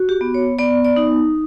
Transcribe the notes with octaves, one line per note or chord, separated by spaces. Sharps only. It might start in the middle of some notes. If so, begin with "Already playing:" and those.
Already playing: F#4
G4
B3
C#5
B3 D5
D5
D#4